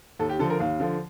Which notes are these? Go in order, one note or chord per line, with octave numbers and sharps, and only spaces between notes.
D#2 A4
G4
D3 F3 A4
A#4
D#2 F5
D3 F3